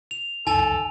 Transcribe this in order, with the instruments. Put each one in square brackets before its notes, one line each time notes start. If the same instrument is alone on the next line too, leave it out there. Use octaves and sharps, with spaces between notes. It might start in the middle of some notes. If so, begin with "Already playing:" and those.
[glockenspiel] F7
[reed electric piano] C#2 F#2 [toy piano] D#4 [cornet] A4 [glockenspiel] G#5 A5 F7